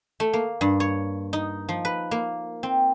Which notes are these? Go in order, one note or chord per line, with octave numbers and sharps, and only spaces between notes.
A3
A#3
G2
C#5
D#4
F3
B4
A#3
C4